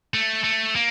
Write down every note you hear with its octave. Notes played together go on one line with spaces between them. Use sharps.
A3
A3
A#3